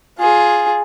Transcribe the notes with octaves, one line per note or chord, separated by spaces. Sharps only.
F4 G#4